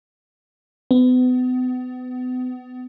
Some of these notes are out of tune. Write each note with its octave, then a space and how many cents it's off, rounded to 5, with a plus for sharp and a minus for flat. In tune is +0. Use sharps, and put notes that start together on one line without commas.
B3 +35